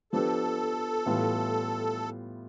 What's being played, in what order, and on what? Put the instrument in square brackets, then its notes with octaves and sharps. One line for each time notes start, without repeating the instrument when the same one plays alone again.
[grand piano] F3 B3 D4 G4 B4 [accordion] A4
[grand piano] A2 E3 G3 B3 F4